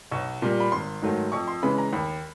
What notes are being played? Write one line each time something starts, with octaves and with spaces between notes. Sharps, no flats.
B1 C#6
A#2 G3
B5
G#1 C6
G#2 D#3 F#3 A3
F2 C#6
C6
C#3 E3 G#3 B5
A#5
D#2 B5